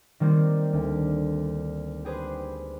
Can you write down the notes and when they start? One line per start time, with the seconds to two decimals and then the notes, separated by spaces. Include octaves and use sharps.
0.20 D#3 G3 A#3 C4 G4 C6
0.73 D2
2.05 G4 G#4 B4 C5